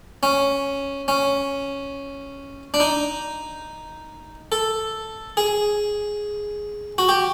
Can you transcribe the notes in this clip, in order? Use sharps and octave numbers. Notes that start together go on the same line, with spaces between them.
C#4
C#4
D4
D#4
A4
G#4
F#4
G4